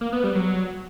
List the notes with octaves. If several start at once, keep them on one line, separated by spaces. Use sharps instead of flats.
A#3
B3
G3
F#3